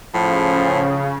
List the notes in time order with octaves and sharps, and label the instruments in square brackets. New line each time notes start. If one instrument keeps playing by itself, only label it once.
[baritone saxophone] A2 [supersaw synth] C#3 [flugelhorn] F3